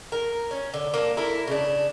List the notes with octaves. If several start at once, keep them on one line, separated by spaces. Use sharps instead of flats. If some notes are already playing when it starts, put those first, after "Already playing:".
A#4
C#4
D3
A#3 D4
E4 A4 A#4
C#3 D4